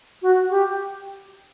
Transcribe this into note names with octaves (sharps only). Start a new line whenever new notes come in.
F#4
G4